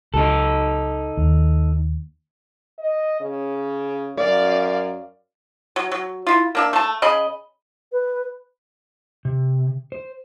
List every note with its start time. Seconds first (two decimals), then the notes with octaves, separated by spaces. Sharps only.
0.14 C#2 D#4 A4
1.17 D#2
2.79 D#5
3.20 C#3
4.18 F#2 D5 F5
5.76 F#3
5.91 F#3
6.27 E4 F4
6.55 A#3 D4 E5
6.73 A3 A5
7.02 C#3 D#5 B5
7.92 B4
9.25 C3
9.92 C5